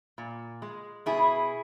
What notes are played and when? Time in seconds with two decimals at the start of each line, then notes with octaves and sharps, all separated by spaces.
0.18 A#2
0.62 G#3
1.06 B2 E4 G#4